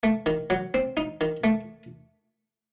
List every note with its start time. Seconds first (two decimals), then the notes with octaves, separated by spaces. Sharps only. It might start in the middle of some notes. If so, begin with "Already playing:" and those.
0.03 A3
0.26 D#3
0.50 F#3
0.74 C4
0.97 D#4
1.21 D#3
1.44 A3